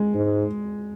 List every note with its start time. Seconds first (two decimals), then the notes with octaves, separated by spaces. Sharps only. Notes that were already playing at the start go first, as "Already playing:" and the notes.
Already playing: G#3
0.14 G#2